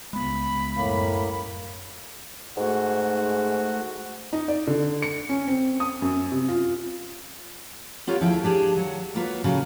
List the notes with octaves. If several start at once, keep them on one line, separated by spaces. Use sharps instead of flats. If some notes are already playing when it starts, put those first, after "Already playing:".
C#2 G#3 B3 B5
F#2 A2 A#3
G#2 A3 F#4
D#4
D5
D3
C#7
C#4
C4
D#6
F#2
C3
F4
B3 F4 G4 A#4 C#5
D2 F3 E4 G#4 C5 G5
D4 G4 G#4
D#2 F#3 F#5
F#3 A#3 F4 F#4 B4
A2 C#3 F#3 F#4